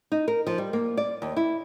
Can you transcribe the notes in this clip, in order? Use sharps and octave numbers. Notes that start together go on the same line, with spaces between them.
D#4
A#4
F3
G3
A#3
D5
D#2
E4